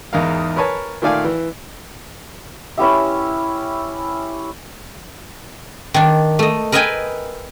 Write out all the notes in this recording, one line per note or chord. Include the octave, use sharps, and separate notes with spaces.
E2 G#2 D#4 A#4 F5
A#4 B4 C#5 G#5 A5
A#2 D#3 A3 D5 F5 G#5
E3
C#4 E4 G4 E5
D#3 D4
A3 D#5
A#4 B4 D#5 E5 G5 G#5